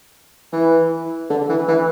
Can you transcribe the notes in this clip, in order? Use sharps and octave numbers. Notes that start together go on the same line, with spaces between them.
E3
D3
E3
E3